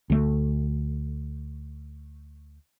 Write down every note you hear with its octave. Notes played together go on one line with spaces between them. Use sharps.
D2 A3